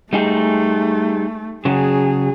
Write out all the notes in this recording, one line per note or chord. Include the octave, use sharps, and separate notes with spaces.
G3 A3 D#4 G#4
C#3 F#3 G#4